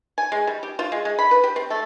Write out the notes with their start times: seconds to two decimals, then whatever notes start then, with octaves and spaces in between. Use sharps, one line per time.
0.18 G#5
0.32 G#3
0.47 G3
0.63 G4
0.79 F4
0.92 G#3
1.05 G#3
1.19 B5
1.31 B4
1.44 G4
1.56 C4
1.70 A3